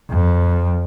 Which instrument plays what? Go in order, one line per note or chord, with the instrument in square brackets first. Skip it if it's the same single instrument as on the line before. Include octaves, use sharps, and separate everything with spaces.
[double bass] F2